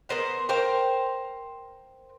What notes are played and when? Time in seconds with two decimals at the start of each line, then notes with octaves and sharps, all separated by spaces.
0.09 B3 A#4 C5 F#5
0.49 A#4 C5 F5 G5